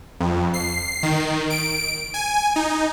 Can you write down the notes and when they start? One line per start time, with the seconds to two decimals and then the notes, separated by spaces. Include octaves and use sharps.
0.20 F2
0.54 C7
1.03 D#3
1.50 D7
2.14 G#5
2.56 D#4